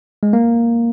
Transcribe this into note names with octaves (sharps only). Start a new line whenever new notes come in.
G#3
A#3